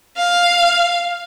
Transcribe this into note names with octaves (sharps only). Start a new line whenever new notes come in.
F5